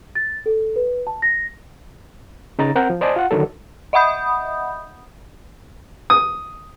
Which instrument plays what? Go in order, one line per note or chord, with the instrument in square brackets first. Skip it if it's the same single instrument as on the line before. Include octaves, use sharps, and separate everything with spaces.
[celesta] A6
A4
B4
A5
A#6
[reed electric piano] C#3 D#4 A#5 A6
C4 A#4 F#5 G6
F3
C5 D5 D#5 G#5 A5
F4 F#5
D3 D#3 F#3 A4
[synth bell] D#5 E5 F#5 B5 D#6 G6
[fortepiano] D#6